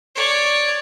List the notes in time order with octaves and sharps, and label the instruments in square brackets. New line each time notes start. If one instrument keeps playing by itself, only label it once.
[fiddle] C#5 D5